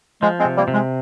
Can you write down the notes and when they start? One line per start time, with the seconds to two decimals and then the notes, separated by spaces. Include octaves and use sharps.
0.22 F3 G#3
0.39 G#3 C4
0.45 C3
0.56 G3 A#3
0.68 C3
0.74 G#3